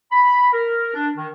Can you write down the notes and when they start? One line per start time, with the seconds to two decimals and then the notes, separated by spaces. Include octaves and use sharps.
0.12 B5
0.53 A#4
0.94 D4
1.17 D#3